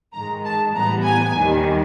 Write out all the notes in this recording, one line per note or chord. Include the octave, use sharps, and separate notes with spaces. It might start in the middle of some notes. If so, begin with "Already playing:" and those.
G#2 D#3 G#3 A#5
A5
A2 E3 G3 B3 A#5
G#5
D#2 D#3 G3